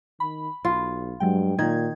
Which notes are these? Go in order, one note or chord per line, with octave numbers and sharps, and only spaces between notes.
D#3 B5
B1 F4
G2 F#3 G#3 G5
A#2 D#3 G#6